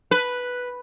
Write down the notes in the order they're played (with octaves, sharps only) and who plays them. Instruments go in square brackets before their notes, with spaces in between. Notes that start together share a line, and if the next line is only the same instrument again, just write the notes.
[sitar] B4